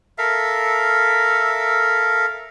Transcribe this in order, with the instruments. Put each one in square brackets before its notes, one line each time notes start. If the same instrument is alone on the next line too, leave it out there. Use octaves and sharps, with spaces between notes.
[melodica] A4 A#4 E5 F5